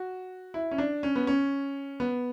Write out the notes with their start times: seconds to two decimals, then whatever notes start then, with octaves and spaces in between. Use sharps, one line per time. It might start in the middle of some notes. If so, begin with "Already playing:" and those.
Already playing: F#4
0.54 E4
0.71 C#4
0.78 D4
1.03 C#4
1.16 B3
1.27 C#4
2.00 B3